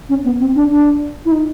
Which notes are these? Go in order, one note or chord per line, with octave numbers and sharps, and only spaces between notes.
C#4
B3
C4
D4
D4
E4
D#4